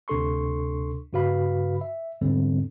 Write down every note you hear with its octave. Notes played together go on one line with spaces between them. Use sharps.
D2 C3 D4 A4 C6 C#6
G2 C#3 F#4 B4 F5 B5
E5
E2 G#2 D3 G3 B3 C4